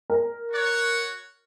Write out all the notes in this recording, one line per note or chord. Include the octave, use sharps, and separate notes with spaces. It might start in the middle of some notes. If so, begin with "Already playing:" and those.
A#4
F#4 C#5 F#5